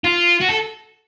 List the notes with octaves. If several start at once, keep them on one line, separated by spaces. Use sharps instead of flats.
F4
F#4
A4